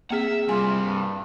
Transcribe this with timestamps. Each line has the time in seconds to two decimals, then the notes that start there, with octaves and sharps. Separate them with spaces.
0.10 A#3 C4 G#4 E5 F#5
0.49 C3 G3 F4 G#5
0.86 G2